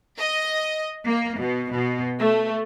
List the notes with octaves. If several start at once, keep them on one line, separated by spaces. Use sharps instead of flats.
D#5
A#3
B2
B2
A3